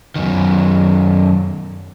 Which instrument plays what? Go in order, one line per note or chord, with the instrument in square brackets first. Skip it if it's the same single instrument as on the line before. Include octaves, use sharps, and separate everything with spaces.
[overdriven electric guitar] F#2 D#3